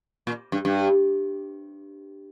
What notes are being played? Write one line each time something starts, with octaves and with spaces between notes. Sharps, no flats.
A#2
G2
G2